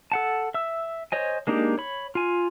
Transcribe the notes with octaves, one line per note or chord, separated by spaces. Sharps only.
A4 F#5 A5
E5 E6
C5 C#5 D#5 G#5
G#3 A#3 D4 D#4 G4
C#5 B5
F4 G#5